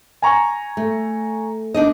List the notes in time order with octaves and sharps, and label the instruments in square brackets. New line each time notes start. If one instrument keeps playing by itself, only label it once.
[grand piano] G#5 A#5 C#6
[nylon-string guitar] A3
D4 D#4 D#5